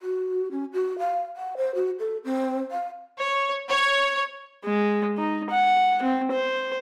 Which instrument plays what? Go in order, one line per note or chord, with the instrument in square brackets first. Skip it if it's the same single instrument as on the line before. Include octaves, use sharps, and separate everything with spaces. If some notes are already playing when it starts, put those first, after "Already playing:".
[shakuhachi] F#4
C#4
F#4
F5
F#5
C5
F#4
A4
C4
F5
[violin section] C#5
C#5
[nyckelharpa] G#3
D#4
F#5
C4
C5